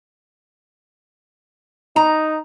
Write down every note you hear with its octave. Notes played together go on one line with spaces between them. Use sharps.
D#4 A#5